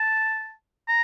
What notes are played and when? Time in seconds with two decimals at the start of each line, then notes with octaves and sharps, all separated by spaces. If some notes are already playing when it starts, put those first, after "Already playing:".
Already playing: A5
0.88 A#5